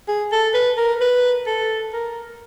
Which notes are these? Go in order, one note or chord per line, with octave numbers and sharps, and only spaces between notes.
G#4
A4
B4
A#4
B4
A4
A#4